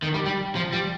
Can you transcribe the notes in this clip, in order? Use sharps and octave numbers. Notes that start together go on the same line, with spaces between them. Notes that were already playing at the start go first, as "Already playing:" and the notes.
D#3
G3
G3
F3
G3